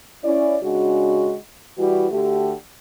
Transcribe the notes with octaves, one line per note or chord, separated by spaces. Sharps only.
C#4 E4 D5
C#3 G#3 D4 F#4
E3 G3 E4 F#4
D3 A3 F#4 G4